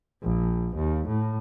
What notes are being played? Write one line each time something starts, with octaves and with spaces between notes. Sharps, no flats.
A#1
D#2
A2